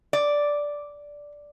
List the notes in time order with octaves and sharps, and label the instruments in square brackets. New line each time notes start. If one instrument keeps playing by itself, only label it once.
[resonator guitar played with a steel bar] D5